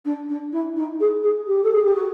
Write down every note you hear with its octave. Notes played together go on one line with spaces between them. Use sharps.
D4
D4
E4
D#4
G#4
G#4
G4
A4
G#4
G4
F#4